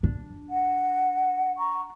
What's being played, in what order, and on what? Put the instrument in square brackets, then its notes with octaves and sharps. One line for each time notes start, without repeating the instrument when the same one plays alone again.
[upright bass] D4
[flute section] F#5
A#5 C#6